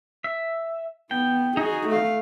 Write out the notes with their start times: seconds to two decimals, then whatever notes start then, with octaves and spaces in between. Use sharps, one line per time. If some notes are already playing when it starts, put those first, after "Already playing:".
0.24 E5
1.11 B3 G5
1.57 D#4 F#4 G#4
1.88 A3 F5